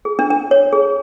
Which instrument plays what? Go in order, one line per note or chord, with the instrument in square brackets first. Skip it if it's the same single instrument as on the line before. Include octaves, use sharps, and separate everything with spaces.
[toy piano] G#4
D4
D4
C#5
G#4